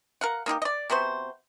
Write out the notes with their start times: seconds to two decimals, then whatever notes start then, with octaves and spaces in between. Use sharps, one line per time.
0.21 A#4 F5 F#5
0.46 A#3 D#4 F4 G4
0.62 D5 D#5
0.90 C3 B3 F#4 C5